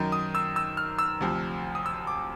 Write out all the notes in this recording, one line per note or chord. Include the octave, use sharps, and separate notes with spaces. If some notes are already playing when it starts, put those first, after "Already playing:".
Already playing: F#2 D#3
D#6
E6
E6
F6
E6
D2 C3 F3
D#6
E6
D6